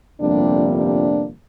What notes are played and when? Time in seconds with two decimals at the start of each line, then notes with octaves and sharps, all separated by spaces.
0.21 G1 F2 C3 G3 A#3 D4
0.75 D4